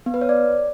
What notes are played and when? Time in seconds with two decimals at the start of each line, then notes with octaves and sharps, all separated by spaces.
0.06 B3
0.14 B4
0.21 C#5
0.29 D5